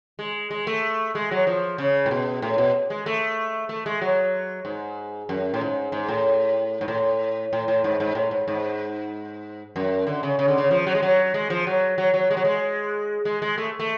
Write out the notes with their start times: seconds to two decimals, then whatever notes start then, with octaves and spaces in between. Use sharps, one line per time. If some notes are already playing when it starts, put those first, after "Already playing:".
0.19 G#3
0.51 G#3
0.67 A3
1.15 G#3
1.31 F#3
1.47 F3
1.78 C#3
2.06 A2
2.11 B2
2.42 A2
2.58 B2
2.90 G#3
3.06 A3
3.69 A3
3.86 G#3
4.02 F#3
4.65 G#2
5.29 F#2
5.54 A2
5.61 G#2
5.92 G#2
6.08 A2
6.81 G#2
6.88 A2
7.53 A2
7.68 A2
7.84 G#2
8.00 G#2
8.15 A2
8.31 G#2
8.48 G#2
9.76 F#2
10.07 D3
10.23 C#3
10.39 C#3
10.48 D3
10.58 C#3
10.71 F3
10.87 F#3
10.95 G#3
11.02 F#3
11.34 G#3
11.50 F3
11.67 F#3
11.98 F#3
12.14 F#3
12.31 G#3
12.37 F#3
12.45 G#3
13.25 G#3
13.42 G#3
13.58 A3
13.79 A3